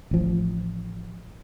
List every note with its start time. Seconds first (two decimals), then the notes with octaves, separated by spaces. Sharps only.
0.11 A1 F3